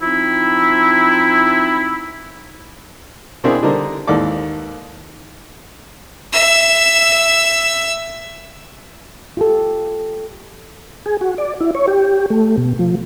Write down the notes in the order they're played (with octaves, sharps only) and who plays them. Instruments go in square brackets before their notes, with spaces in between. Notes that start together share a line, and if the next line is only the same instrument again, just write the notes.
[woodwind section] F3 C4 D#4 E4
[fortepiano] B2 A#3 C4 D4 E4 G#4
D3 G3 D4 D#4 A#4 C5
D#2 G#2 E3 A4 D5 D6
[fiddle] E5 E6
[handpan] F4 G4 A4
[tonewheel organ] G#4
F#4
D5
E4
C#5
G4
A3
B2
F3